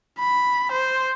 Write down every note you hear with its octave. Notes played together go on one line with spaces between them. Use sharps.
B5
C5